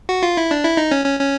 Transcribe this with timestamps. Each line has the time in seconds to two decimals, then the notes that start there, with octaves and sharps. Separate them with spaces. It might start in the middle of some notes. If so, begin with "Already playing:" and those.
0.09 F#4
0.23 F4
0.37 E4
0.51 D4
0.64 E4
0.77 D#4
0.92 C#4
1.05 C#4
1.19 C#4